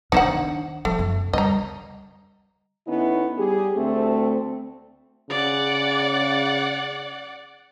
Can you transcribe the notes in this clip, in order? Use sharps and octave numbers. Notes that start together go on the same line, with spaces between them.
D#3 D4 D#4 C5 F#5
F3 A3
F#2
D3 G3 D#5 A#5
D3 B3 C#4 D#4 E4
G3 G4 G#4
D2 A3 C4
C#3 D5 F#5